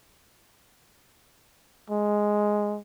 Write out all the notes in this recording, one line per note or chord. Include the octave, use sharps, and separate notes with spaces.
G#3